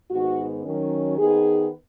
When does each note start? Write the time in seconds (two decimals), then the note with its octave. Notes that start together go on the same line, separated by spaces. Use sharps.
0.10 G#2 D#3 B3 D#4 F#4
0.64 D#3 F#3 C#4
1.17 D#3 B3 D#4 G#4